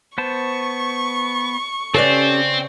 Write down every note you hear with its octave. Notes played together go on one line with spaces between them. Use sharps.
B3 C5 A5 C#6
C#3 C4 C#4 G4 A4 B4 D5